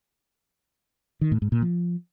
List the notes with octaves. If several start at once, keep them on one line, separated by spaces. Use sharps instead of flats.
D#3
A2
G#2
A#2
F3